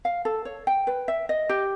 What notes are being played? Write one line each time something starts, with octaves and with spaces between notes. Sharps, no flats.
F5
A4
C#5
G5
B4
E5
D#5
G4